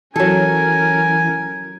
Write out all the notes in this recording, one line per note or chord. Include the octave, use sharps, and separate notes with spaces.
E3 F#3 C#4 A4 A#4 G#5